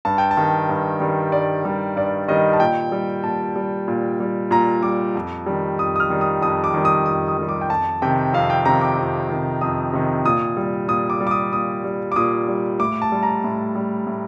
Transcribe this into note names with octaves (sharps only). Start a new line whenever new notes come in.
G2 A5
G5
A5
D#3 G3
G2
D#3 G3
G2 D5
D#3 G3
G2 D5
D#3 G3 D#5
A5
A#2 G5
G3
A#2 A5
G3
A#2
G3
A#2 A#5
G3 D6
F2
D#3 G3
F2 D#6
D#6
F6
D#3 G3
D#6
F2 D#6
D6
D#3 G3
D#6
F2 D#6
D#6
D#3 G3
D6
G5
F2 A5
C3 D#3 G5
F2 F5
G5
C3 D#3 A#5
D6
F2
C3 D#3
F2 D#6
C3 D#3
A#2 D#6
G3
A#2 D#6
D6
G3
D6
D#6
A#2 D#6
G3
D6
A#2 D#6
G3
A2 D6
A5
G3
A#5
A2
G3
A2